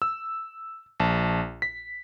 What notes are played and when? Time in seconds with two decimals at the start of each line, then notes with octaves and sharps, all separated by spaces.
0.02 E6
1.00 A#1 A5
1.62 B6